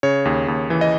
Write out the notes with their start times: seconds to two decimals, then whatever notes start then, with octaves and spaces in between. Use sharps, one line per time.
0.03 C#3 C#5
0.25 D#2
0.48 D#2
0.70 E3
0.81 D#5